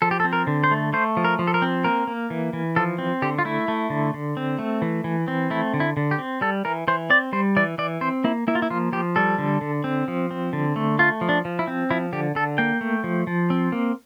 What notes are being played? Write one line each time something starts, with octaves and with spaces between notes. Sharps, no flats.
F3 A4
G4
A4
C4
A#4
D3
C5
A3
A3 C5
F3
A#4
F3
A4
A#4
C4
A#3 A#4
A#3
E3
E3
F3 A4
C4
D3 G4
F4
A3 E4
A3
D3
D3
C4
A3
E3
E3
C4
A3 E4
D3
E4
D3
G4
C4
G3 A4
E3 A#4
E3 C5
C4 D5
G3 C5
E3 D5
E3 D5
C4 C5
A#3 E4
A#3 E4
F4
E4
F3 F4
F3 G4
G3 A4
D3
D3
C4
F3
C4
D3
A3
A3 F4
F3
D4
F3
E4
C4
F3 E4
D3 G4
D3 A4
A#3 G5
A3
F3
F3
C4
A#3